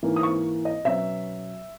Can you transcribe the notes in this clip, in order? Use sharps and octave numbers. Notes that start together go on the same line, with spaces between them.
G#2 E3 A#3
D#6
C#6
D#5
B2 F#3 C#4 E5